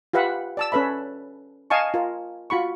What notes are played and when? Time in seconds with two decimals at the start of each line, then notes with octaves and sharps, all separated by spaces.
0.13 F4 G4 B4 E5 F#5
0.57 D5 A5 E6
0.72 C#4 A4 B4 E5 B5
1.70 D#5 F5 G#5 A5 C#6
1.94 F4 A#4
2.50 F4 F#4 B5 C#6